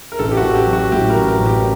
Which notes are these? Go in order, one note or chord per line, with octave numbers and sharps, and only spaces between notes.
A#4
A1 A4
G4
F#4
A1
G4
F#3
F#4
A2 G4
A#4
A1
A#4
A1
G4